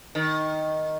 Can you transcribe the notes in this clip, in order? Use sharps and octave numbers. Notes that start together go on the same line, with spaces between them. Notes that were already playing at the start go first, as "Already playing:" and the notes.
D#3